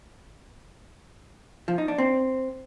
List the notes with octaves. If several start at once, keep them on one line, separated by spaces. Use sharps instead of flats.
F3
D#4
D4
C4